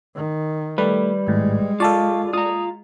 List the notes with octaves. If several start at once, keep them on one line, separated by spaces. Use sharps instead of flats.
D#3
G3 A3 B4 D5
G#1 A2 G#3
F4 A4 D5 F5 A5 C#6
F4 A#5 D#6